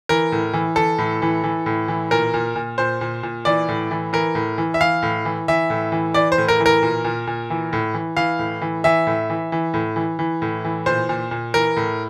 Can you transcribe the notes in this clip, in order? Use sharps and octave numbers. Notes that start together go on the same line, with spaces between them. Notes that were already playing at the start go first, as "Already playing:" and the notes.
E3 A#4
A2
E3
E3 A4
A2
E3
E3
A2
E3
A#2 A#4
A#2
A#2
A#2 C5
A#2
A#2
E3 D5
A2
E3
E3 A#4
A2
E3
E5
E3 F5
A2
E3
E3 E5
A2
E3
E3 D5
C5
A2
A#4
E3
A#4
A#2
A#2
A#2
E3
A2
E3
E3 F5
A2
E3
E3 E5
A2
E3
E3
A2
E3
E3
A2
E3
A#2 C5
A#2
A#2
E3 A#4
A2